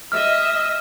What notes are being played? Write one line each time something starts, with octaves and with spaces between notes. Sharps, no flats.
D#5 E5 F6